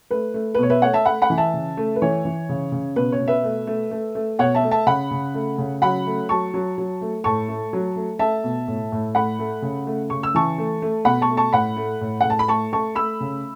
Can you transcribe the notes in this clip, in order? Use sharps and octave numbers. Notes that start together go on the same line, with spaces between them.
A3 B4
A3
B4
B2 C#5
B4 E5
A3 C#5 F#5
E5 A5
A3 F#5 B5
F#5 B5
E3
E5 A5
C#3
A3
B4
E3 C#5
E3
C#3
C#3
B2 B4
C#5
B2
B4 E5
A3
A3
A3
A3
B2 C#5 F#5
E5 A5
A3
E5 A5
C#3 F#5 B5
C#3
A3
C#3
F#3 F#5 B5
A3
F#3 A5 C#6
F#3
F#3
A3
A2 A5 C#6
A3
F#3
A3
A3 E5 A5
B2
A2
A2
A3 F#5 B5
A3
C#3
A3
C#3 C#6
E6
E3 A5 C#6
A3
A3
B2 F#5 B5
A5 C#6
A3
A5 C#6
A2 F#5 B5
A3
A2
A2 F#5
A5
B5
A3 A5 C#6
A3 A5 C#6
A3 B5 E6
C#3